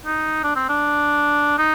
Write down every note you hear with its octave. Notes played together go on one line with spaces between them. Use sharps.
D#4
D4
C4
D4
D#4